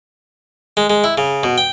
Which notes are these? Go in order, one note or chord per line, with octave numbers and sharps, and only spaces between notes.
G#3
G#3
E4
C#3
B2
G5